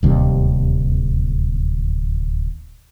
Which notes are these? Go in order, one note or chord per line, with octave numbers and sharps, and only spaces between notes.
D1 D#2 C3 G3